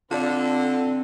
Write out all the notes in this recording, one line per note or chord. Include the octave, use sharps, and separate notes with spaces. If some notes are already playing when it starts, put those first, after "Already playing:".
D3 C4 F4 D5 A5